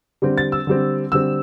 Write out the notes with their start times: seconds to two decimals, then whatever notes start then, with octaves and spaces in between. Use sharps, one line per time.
0.22 D3 G3 C4
0.38 A6
0.52 E6
0.67 D3 G3 C4
1.12 D3 G3 C4 E6